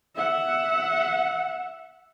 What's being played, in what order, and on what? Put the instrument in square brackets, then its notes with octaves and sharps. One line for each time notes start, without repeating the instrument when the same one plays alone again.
[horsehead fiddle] E5 F#5